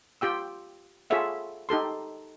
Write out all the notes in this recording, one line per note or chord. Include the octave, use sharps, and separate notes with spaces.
F4 G4 G5 E6
F4 G#4 A4 C#5 E5 F#5
D#4 G4 A4 C6